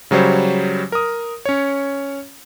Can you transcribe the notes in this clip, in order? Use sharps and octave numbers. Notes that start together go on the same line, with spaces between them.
C#3 F#3 G3 C5 C#5
A#4 D#6
C#4 C#5